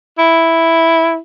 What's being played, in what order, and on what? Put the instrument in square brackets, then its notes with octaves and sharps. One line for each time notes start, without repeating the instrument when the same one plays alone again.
[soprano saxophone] E4